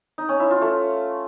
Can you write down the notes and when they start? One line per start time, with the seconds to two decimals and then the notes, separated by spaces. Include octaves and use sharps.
0.18 D#4
0.29 C#4
0.40 E4
0.51 F4
0.61 A3